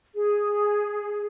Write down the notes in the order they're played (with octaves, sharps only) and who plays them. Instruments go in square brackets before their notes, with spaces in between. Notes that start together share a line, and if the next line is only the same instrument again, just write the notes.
[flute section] G#4